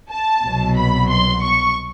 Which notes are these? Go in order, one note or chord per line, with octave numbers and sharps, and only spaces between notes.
A5
C2 B2 F#3
B5
C6
C#6